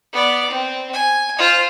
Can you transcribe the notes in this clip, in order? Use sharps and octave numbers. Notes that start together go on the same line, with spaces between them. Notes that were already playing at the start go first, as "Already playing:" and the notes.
B3 D5
C4
G#5
F4 C5